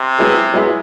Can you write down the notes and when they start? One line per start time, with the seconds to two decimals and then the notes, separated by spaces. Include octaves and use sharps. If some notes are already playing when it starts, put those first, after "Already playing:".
Already playing: C3
0.18 F#3 B3 E4 G#4
0.54 F#3 B3 E4 G#4